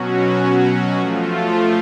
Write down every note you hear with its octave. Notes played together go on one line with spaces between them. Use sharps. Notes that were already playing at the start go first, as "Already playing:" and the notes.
Already playing: B2 F#3 C#4 F#4
F3 A3 F4